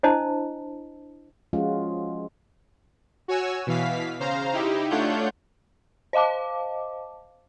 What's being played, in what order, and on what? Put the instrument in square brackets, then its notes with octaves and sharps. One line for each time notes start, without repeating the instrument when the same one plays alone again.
[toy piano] D4 E4 C5 D#5 A5
[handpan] F3 G#3 C#4 F4 F#4
[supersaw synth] F#4 C#5 G#5 E6
B2 E3 F5 B6
C#3 C5 F5 A#5
D#4 E4 G4
A3 D4 F4 C#5 F#5 G6
[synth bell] C5 D#5 F5 A5 D6